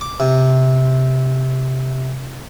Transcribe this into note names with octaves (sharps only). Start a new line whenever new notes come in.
D6
C3